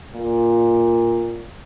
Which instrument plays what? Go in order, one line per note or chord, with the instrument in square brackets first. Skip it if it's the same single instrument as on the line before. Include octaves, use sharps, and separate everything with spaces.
[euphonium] A#2